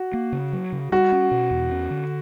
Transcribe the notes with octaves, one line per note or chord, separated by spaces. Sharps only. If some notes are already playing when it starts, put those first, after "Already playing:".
Already playing: F#4
A#3
C#3
F#3
C#3
G3 F#4
C#4
B2
E2
C#4
D3